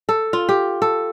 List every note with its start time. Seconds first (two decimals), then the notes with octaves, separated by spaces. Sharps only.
0.09 A4
0.33 F4
0.49 G4
0.82 A4